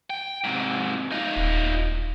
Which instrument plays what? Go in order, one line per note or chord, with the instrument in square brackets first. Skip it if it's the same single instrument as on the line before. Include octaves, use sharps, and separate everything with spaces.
[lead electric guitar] G5
G#2 C3
D#4 F4
[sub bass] D#1